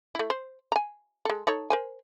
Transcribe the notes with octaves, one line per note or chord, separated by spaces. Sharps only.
A3 E4
C5
G#5 A#5
G#3 A4
D#4 A4 C#5
A#4 C5 G#5